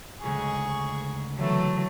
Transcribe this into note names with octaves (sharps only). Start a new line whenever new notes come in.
D2 C#3 G#3 G#4 C#6
D3 E3 F#3 A3